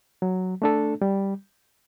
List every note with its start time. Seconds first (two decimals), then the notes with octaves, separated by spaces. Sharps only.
0.22 F#3
0.62 A3 D4 A4
1.02 G3